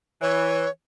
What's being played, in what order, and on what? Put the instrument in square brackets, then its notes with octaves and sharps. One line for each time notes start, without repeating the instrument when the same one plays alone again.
[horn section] E3 [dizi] C#5